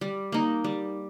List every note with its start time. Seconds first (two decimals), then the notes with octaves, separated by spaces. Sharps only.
0.01 G3
0.32 A#3 D#4
0.64 G3